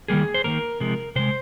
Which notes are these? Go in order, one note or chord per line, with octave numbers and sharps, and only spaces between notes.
D#3 G3 A#3 G#4
C5
D#3 G3 A#3 A#4
C3 F3 G#3
C3 F3 G#3 C5